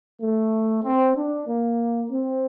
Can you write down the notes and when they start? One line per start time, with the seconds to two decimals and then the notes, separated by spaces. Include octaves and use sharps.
0.21 A3
0.84 C4
1.16 D4
1.47 A#3
2.11 C4